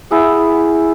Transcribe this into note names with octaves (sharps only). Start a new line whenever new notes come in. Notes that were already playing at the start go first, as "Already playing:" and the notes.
E4 G#4 F#5